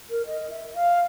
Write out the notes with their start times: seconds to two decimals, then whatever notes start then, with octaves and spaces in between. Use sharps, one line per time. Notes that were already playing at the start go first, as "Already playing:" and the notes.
0.10 A#4
0.26 D#5
0.50 E5
0.74 F5